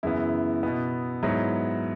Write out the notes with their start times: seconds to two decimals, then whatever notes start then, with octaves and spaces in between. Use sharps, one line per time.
0.03 F#2 C#3 E3 B3 E4
0.63 B2 B3
1.23 G#2 F#3 B3 E4